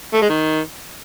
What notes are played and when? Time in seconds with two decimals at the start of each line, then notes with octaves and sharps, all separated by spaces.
0.14 A3
0.22 G#3
0.29 D#3